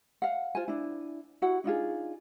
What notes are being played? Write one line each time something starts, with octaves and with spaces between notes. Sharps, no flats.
F5 F#5
F4 C5 G#5
D4 E4
E4 F#4 F#5
D4 D#4 F4 G#4